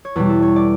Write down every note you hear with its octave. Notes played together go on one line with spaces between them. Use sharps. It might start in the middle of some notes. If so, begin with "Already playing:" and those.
C#5
E2 B2 G3 B4
A4
C#5
D5